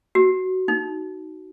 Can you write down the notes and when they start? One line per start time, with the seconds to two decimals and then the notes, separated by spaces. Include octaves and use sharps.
0.15 F#4
0.68 D#4